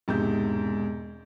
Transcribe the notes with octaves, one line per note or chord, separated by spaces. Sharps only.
E1 G#2 C3 G6